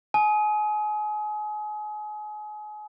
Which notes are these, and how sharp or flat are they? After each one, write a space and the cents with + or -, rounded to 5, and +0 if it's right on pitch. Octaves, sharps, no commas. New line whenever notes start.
G#5 +30 D#6 +25